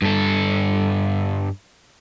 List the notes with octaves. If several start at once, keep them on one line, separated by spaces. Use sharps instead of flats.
G2 A4